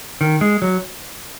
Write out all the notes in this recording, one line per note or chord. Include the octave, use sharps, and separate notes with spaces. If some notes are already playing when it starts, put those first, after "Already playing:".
D#3
G#3
F#3